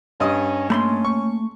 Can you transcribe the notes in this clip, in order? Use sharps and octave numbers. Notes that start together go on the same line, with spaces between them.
G2 C#4 D#5 D#6
A3 A#3 C#4 B5 C6
C#6